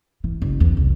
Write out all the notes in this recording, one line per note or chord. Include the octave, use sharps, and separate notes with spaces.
E3
F#1
E2
C2